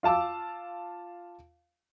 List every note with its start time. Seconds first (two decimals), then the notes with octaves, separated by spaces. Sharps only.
0.03 F4 F5 A5 D6 E6